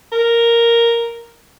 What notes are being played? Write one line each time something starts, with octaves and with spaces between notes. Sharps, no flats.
A#4